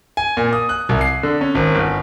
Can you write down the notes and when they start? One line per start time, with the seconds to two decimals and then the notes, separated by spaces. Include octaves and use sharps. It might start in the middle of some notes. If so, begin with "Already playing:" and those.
0.17 G#5
0.37 A#2
0.53 D#6
0.69 F#6
0.89 C2
1.01 C7
1.23 D3
1.41 C#4
1.55 G#1
1.75 G1